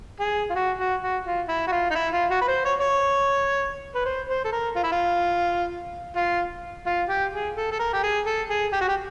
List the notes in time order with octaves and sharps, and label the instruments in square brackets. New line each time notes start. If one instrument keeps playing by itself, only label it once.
[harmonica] G#4
F4
F#4
F#4
F#4
F4
E4
F#4
F4
D#4
E4
F4
F#4
B4
C5
C#5
C#5
B4
C5
C5
A4
A#4
F4
E4
F4
F4
F4
G4
G#4
A4
A4
A#4
G4
G#4
A4
G#4
G4
F#4
G4